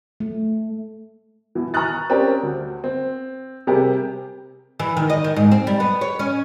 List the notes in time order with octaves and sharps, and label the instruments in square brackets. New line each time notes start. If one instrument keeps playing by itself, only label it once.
[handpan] A3
[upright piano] B2 E3
A#5 C#6 D#6 F6 F#6 A6
C4 C#4 G4 A#4 D5 A#5
D2
C4
C3 G3 G4 G#4 A#4
[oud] E3
D#3
D#5
D#3
G#2
C4
G3
B3
C#5
C#4